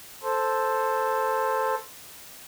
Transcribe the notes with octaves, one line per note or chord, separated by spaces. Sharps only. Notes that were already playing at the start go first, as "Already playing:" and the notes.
A4 C5